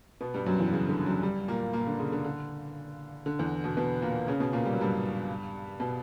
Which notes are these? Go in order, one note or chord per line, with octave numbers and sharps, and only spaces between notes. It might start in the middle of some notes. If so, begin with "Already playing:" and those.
B2 B3
G2 G3
F#2 F#3
E2 E3
C#3
D3
F#2 F#3
G2 G3
A#2 A#3
A#2 A#3
D3
C#3
D3
D3
D3
E2 E3
B2 B3
B2 B3
A#2 A#3
C#3 C#4
B2 B3
A#2 A#3
G3
F#3
G2 G3
B2 B3